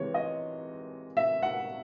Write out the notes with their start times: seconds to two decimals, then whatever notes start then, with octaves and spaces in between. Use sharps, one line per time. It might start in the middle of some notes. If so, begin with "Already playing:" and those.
Already playing: C3 E3 G#3 C#5
0.14 D#5
1.17 E5
1.43 F#5